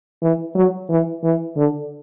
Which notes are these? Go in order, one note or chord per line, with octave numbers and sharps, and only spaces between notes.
E3
F#3
E3
E3
D3